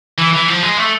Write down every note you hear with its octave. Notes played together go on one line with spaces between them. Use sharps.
E3
E3
F3
G#3
A3